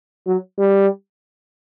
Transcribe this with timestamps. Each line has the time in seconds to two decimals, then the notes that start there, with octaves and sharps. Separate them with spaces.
0.26 F#3
0.59 G3